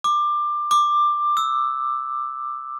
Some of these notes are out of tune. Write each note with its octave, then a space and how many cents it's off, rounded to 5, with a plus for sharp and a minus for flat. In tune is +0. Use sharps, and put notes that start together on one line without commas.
D6 +20
D6 +15
E6 -5